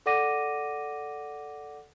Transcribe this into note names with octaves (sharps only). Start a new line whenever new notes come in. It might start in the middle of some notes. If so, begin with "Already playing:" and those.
A4 D5 F#5 D6 A#6 D#7